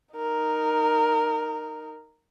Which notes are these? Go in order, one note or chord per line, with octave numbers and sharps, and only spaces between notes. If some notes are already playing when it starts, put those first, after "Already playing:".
D#4 A#4